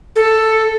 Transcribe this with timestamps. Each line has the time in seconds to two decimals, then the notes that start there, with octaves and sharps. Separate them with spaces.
0.16 A4